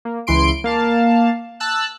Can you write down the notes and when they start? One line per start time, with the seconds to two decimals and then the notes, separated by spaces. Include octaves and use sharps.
0.05 A#3
0.27 C#2 E3 C6 D7
0.64 A#3 F5 A5
1.60 A5 E6 F#6